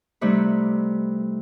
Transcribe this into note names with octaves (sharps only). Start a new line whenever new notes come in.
C3 G3 A3 D#4 B4